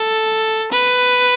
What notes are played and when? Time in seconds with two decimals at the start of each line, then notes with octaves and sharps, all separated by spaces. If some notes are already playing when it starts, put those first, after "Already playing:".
Already playing: A4
0.72 B4